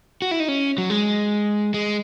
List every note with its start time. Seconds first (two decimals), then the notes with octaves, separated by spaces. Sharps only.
0.22 F#4
0.31 E4
0.40 D#4
0.48 C#4
0.78 F#3
0.90 G#3
1.74 G#3